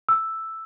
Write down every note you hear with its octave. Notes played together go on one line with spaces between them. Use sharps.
E6